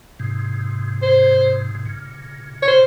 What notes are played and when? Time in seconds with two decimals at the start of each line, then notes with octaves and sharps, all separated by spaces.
0.20 G#2 C3
1.02 C5
1.75 C3
1.85 A#2 C#3
2.62 C#5
2.68 C5